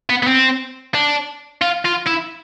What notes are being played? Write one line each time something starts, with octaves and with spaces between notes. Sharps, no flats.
B3
B3
C4
D4
F4
F4
E4